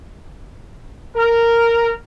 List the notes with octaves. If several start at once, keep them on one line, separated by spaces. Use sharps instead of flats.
A#4